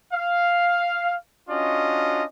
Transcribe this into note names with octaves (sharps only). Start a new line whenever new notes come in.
F5
C#4 D4 F4 F#4 D#5